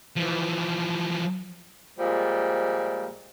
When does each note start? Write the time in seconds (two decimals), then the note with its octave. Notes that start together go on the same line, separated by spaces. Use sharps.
0.16 E3 F3
1.99 A#2 F3 G3 G#3